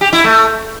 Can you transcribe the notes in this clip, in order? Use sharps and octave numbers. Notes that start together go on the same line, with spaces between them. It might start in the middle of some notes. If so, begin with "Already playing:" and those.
G4
E4
A3